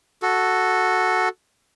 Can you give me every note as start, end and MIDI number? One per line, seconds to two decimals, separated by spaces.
0.22 1.29 66
0.22 1.29 69